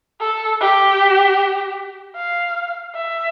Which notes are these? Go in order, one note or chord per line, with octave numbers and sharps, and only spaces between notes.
A4
G4
F5
E5